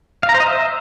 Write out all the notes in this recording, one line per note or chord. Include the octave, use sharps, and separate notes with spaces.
F5
A#5
C5
D#5
E5